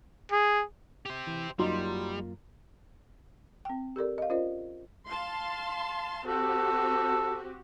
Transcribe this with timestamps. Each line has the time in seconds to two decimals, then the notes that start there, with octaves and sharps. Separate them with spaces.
0.32 G#4
1.06 G4 C5
1.27 E3
1.59 F#2 F#3 G3 A#3 D#4 F4 C6
3.65 C4 G5
3.96 G4 A4 A#4 D5
4.18 D#5 F5
4.30 C#4 F4 A#4 C5 D5 D#5
5.08 F5 A5 C6
6.28 C4 F#4 G4 A4